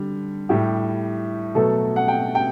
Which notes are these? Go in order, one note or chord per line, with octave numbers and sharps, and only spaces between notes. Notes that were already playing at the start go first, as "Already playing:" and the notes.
Already playing: D3 G3
A2 G3 G4
B2 F#3 A3 A4
F#5
G5
G5